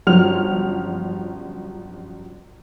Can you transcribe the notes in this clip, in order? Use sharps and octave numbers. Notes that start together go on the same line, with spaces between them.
G1 F#2 F3 F6 F7